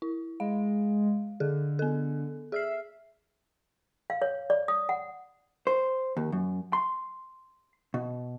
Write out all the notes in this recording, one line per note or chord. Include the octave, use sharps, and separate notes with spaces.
E4
G#3 F5
D3 G#4 A4
B3 A4
G#4 E5 F6 C7
F5
C#5
D5
D#6
F#5
C5
D#2
F#2
C6
B2